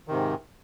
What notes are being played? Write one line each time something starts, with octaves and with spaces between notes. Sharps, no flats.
G#2 C3 D#3